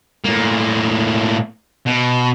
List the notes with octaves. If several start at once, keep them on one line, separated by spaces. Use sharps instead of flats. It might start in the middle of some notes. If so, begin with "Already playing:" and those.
A2 A#3
B2